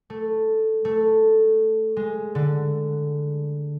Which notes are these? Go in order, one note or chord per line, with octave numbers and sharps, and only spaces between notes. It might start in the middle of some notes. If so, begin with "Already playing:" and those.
A3
A3
G#3
D3